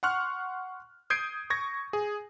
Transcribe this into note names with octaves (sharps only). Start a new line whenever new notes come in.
F#5 C6 C#6 F6 F#6
D#6 G6 G#6 C7 D7
C#6 G#6 A#6
G#4